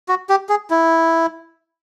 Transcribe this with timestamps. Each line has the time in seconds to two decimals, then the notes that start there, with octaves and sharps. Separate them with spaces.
0.09 F#4
0.29 G4
0.49 G#4
0.70 E4